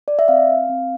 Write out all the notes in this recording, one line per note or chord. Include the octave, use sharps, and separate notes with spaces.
D5
E5
C4 F5
C4